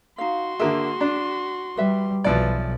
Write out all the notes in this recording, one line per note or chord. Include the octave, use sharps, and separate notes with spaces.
D#4 F#4 F5 C6
D3 A#3 G#4 E5
D4
G3 B4 E5
B1 E3 F3 D5